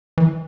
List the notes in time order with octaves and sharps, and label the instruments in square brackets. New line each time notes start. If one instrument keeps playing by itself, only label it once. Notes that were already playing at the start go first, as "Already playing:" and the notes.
[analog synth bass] E3